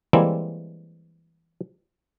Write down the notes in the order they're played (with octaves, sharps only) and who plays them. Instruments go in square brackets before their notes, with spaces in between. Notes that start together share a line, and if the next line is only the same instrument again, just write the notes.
[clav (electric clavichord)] E3 G3 G#3 A#3 C4 E4